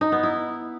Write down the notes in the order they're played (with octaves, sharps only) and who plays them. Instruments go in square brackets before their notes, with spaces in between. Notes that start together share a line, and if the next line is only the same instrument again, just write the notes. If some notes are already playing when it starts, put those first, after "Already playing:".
[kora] D#4
B3
E4